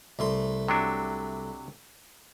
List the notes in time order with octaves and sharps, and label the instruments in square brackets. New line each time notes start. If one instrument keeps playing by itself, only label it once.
[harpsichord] C2 A3 C6
[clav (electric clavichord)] C3 F#3 D4